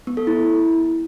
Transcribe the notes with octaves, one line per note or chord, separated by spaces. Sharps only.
B3
A4
E4